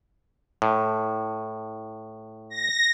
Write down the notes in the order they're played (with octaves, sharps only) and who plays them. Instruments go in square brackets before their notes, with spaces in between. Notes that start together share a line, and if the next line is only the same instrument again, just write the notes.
[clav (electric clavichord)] A2
[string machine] A#6